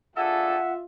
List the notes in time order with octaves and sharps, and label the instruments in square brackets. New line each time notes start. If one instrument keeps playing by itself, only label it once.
[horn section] D4 G#4 A4 [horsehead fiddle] F4 [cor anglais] E5 [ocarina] F#5